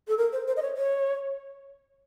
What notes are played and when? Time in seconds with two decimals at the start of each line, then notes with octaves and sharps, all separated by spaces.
0.08 A4
0.18 A#4
0.33 C5
0.48 C5
0.57 D#5
0.62 C#5
0.77 C#5